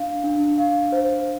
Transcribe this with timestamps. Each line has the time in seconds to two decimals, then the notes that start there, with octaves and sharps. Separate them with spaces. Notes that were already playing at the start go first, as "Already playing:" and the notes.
Already playing: D4 F5
0.24 D4
0.58 F5
0.92 C5